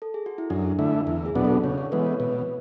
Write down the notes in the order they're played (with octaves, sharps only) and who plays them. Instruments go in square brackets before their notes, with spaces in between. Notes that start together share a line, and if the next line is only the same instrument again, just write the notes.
[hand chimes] A4
G#4
F#4
E4
[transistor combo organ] F#2 [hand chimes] D4
[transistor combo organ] D3 A3 E4
[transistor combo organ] E2 [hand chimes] E4
[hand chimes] G#4
[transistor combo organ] B2 F#3 B3 D4
[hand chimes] A4
[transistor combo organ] C#3 [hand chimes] C#5
[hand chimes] C#5
[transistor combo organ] E3 G#3 B3 [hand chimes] B4
[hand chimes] C#5
[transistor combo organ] B2 [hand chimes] B4